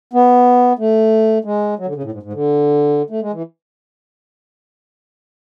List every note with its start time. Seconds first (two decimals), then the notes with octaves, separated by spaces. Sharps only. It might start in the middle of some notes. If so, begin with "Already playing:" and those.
0.13 B3
0.79 A3
1.44 G#3
1.79 F#3
1.86 D3
1.95 C#3
2.03 A2
2.12 G#2
2.23 G#2
2.33 D3
3.10 A3
3.22 G#3
3.33 E3